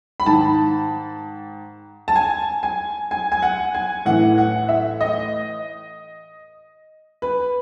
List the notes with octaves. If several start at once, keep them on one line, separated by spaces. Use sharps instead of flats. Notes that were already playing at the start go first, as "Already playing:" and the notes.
B5
G#2 D#3 A5
A5
G#5
G#5
G#5
G#5
F#5
G#5
A2 E3 F#5
F#5
E5
D#5
B4